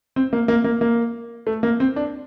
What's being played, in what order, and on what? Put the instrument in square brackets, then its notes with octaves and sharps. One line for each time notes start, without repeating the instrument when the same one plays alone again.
[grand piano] C4
A#3
A#3
A#3
A#3
A3
A#3
C4
D4